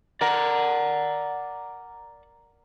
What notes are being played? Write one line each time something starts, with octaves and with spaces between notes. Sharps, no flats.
A#4 D5 F#5